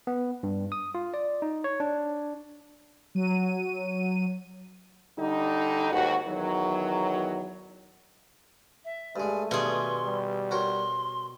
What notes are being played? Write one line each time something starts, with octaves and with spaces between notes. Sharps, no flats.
B3
G2
D#6
F4
D5
D#4
C#5
D4
F#3 D#7
D3 G3 D#4
D#2 G#2 F#4
E2 D#3 F#3
E5
G2 G#3 A3 G#5
G2 B2 D#3 G#4 C6
G3
F#4 A#4 C#5 C6